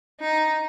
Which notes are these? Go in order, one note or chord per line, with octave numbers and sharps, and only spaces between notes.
D#4